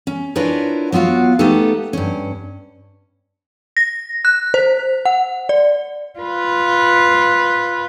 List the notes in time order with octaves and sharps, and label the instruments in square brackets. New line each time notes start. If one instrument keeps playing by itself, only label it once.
[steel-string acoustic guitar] C#4
D4 E4 F4 A#4 B4 C#5
F#3 B3 F4 F#4 F5
A3 B3 D#4 F4 G4 A4
G2 C#4
[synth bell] A#6
F#6
C5
F#5
D5
[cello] F4 B4